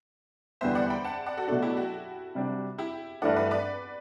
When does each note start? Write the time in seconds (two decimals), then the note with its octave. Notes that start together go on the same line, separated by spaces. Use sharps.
0.61 E2 D3 G3 B3 C5 E5
0.75 D5 F#5
0.90 G5 B5
1.05 F#5 A5
1.26 D5 F#5
1.37 F#4 A4
1.48 B2 F#3 A3 D4 F#4 A4
1.62 E4 G4
1.77 F#4
2.35 C3 G3 D4
2.78 E4 G4
3.22 G2 E3 A3 D4 D5 F#5
3.36 B4 D5
3.51 B4 D5